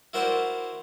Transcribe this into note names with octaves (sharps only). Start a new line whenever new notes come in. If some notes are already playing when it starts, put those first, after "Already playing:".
E4 F#4 A#4 C5 D5 F#5